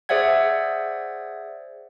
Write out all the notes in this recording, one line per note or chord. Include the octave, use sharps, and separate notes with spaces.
G#4 C5 D5 E5 F#5 G#6